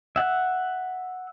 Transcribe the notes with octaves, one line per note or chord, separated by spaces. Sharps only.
E5 F#5